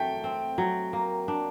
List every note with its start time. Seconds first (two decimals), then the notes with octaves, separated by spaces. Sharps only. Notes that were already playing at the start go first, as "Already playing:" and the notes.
Already playing: F#3 A3 G5
0.24 C4
0.58 F#3
0.93 A#3
1.28 D4